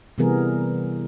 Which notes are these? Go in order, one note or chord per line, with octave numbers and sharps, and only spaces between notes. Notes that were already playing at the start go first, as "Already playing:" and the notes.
C3 E3 G3 B3 G#4 A#4